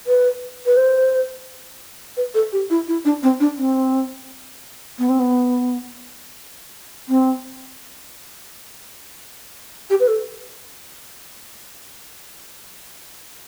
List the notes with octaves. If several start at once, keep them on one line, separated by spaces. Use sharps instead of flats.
B4
B4
C5
B4
A4
G4
E4
E4
D4
C4
D4
C4
B3
C4
B3
C4
G4
B4
A4